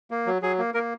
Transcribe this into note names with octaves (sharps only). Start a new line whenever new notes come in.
A#3
F#3
F#3 G#4
A#3
A#3 A#4